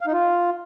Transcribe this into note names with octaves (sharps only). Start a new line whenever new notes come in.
F5
D#4
F4